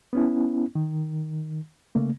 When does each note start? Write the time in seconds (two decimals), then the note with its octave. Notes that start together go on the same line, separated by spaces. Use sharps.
0.13 B3 C#4 E4
0.75 D#3
1.95 C#3 A3 A#3